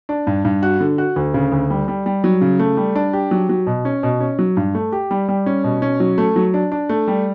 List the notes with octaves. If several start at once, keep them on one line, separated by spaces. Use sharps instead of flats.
D4
G2
G2
F#4
D3
F#4
D2
C#3
D2
G3
G3
G3
F#3
C#3
A3
G3
D4
G4
F#3
F#3
B2
C#4
B2
C#4
F#3
G2
A3
G4
G3
G3
C#4
B2
C#4
F#3
A3
F#3
D4
D4
A3
G3